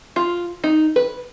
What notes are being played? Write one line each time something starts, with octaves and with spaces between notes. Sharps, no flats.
F4
D#4
B4